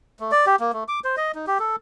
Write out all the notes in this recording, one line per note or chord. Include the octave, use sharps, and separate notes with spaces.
A3
D5
G4
A#3
A3
D6
C5
D#5
D#4
G4
A4